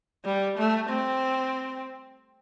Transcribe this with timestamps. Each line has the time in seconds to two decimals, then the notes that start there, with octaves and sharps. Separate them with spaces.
0.25 G3
0.57 A3
0.90 C4